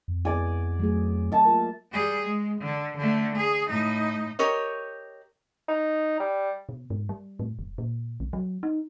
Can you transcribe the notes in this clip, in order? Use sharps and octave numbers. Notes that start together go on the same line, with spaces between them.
F2
B3 E4 G#4 D5 G#5
F#3 A3 G#4
E5 A5
A#3 F4 A#4
G3 G#4
G#3
D3
D3 A3
G#4
A2 D#4
G4 A#4 C#5 D#5
D#4
G3
B2
G#2
G3
A2
F1
A#2
B1
F#3
D#4